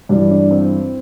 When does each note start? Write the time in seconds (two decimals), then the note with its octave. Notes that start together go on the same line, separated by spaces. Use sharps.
0.09 G2 E3 D4
0.30 D4
0.51 C4